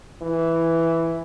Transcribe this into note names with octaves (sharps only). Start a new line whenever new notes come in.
E3